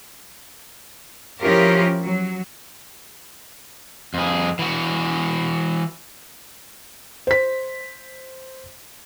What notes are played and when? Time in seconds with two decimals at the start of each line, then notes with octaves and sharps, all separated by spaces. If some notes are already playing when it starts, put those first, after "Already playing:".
1.41 F3 C#4 E4 F4 G4 A#4
2.03 F#3
4.14 F2 G#4
4.59 E3 F#4
7.27 C5 B6